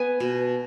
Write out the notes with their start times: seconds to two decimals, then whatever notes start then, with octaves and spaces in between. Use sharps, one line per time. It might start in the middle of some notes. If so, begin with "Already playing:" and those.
Already playing: B3 G#5
0.20 B2